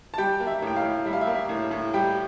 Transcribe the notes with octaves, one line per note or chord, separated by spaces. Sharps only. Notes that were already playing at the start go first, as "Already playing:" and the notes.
A5
G3 G4 G5
A#3
E5
A2 G5
F5
A2
G3 E5
F5
E5
A#3
E5
A2
A2
G3 G4 G5